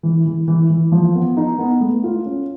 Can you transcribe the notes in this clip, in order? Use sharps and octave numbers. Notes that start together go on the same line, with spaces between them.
E3
E3
E3
E3
F3
B3
D#4
B3
A3
F4
C#4